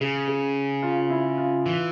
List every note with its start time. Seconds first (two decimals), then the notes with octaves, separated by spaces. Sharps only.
0.01 C#3 G#4
0.28 G#4
0.83 F4
1.10 E4
1.38 F4
1.66 E3